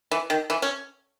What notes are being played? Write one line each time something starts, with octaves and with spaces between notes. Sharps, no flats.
E3
D#3
E3
C#4